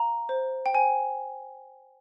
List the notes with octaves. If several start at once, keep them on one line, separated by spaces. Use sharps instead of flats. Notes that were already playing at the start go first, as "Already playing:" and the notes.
Already playing: F5 A#5
C5
G5
C5 G#5